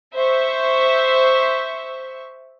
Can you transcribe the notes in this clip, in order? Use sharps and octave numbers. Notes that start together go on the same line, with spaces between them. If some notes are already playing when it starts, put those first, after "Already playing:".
C5 E5 C#6